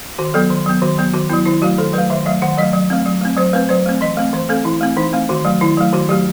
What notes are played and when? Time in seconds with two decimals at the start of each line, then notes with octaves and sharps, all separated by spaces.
0.18 D#3 F#4
0.34 F#3 B3 A4
0.50 D#3
0.66 F#3 B3
0.82 D#3 F#4
0.98 F#3 B3
1.14 D#3 F#4
1.30 F#3 B3 E4
1.46 D#3 E4
1.62 F#3 A3 F#4
1.78 D#3 A4
1.93 F#3 A3 B4
2.10 D#3 E5
2.26 F#3 A3 E5
2.42 D#3 F#5
2.57 F#3 A3 D#5
2.73 F#3
2.90 A3 C4
3.06 F#3
3.22 A3 C4
3.37 F#3 C5
3.53 A3 C4 B4
3.69 F#3 C5
3.86 A3 C4
4.01 E3 D#5
4.17 A3 C4
4.33 E3 C5
4.49 A3 C4 A4
4.65 E3 E4
4.81 A3 C4
4.96 E3 D#4
5.13 A3 C4
5.29 D#3 F#4
5.45 F#3 A3
5.61 D#3 E4
5.77 F#3 A3
5.93 D#3 F#4
6.09 F#3 A3 G4